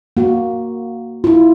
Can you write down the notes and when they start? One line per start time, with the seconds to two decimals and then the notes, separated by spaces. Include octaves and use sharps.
0.17 A#3 F#4
1.24 E4 F4